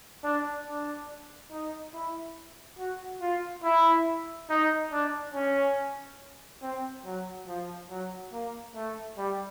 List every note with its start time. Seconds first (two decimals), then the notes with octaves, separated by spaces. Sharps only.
0.23 D4
0.65 D4
1.51 D#4
1.94 E4
2.78 F#4
3.21 F4
3.64 E4
4.50 D#4
4.91 D4
5.34 C#4
6.62 C4
7.05 F#3
7.48 F3
7.90 F#3
8.32 A#3
8.75 A3
9.17 G3